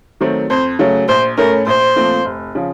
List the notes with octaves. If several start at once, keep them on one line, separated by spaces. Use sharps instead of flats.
D#3 F#3 A3 C4
F2 C5
C#3 F#3 A3
A#1 C5
A2 A3 C#4 A#4
A#1 C5
A#2 F3 A3 C4
F1
C#3 F3